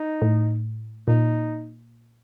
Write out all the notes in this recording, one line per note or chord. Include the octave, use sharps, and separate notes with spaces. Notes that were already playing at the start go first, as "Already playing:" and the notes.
Already playing: D#4
A2
A#2 D#4